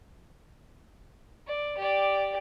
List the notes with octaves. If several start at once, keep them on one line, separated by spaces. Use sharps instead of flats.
D5
G4 D5